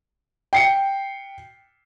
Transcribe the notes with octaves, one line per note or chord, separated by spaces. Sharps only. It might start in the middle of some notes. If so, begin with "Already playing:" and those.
G5 C7 C#7